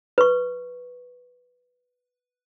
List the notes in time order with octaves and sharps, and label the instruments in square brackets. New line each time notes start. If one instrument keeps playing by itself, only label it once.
[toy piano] B4 C#6